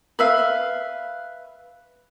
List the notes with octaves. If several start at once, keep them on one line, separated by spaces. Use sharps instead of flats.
B4 E5 F5